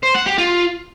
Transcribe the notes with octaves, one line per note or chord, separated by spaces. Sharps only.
C5
F#5
G4
F4